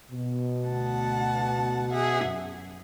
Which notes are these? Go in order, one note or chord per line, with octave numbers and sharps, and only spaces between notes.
B2
D2 F#5 A5
G#4 E5 F#5
F#2